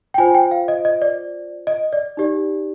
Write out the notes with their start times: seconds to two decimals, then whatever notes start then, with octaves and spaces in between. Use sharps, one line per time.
0.14 G5
0.18 F4 C5 G#5
0.35 G5
0.51 F5
0.68 D#5
0.85 D#5
1.02 D5
1.67 D#5
1.93 D5
2.17 D#4 G4 D5